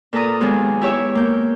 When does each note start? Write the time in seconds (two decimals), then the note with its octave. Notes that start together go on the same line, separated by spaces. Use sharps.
0.13 A#2 A4 B4 A#5 D#6
0.41 D#2 F#3 G#3 B3 G#4
0.81 E4 G4 C#5 E5
1.15 A#3 G6